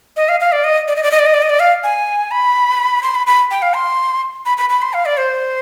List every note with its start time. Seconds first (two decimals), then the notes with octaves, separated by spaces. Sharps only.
0.16 D#5
0.29 F5
0.40 F5
0.52 D5
0.64 D#5
0.88 D5
0.96 D#5
1.03 D5
1.12 D#5
1.19 D5
1.26 D#5
1.34 D5
1.42 D#5
1.50 D5
1.60 F5
1.84 G#5
2.31 B5
3.03 C6
3.15 B5
3.27 B5
3.51 G5
3.62 F5
3.74 C6
4.46 B5
4.58 B5
4.70 B5
4.82 C6
4.93 F5
5.06 D5
5.17 C5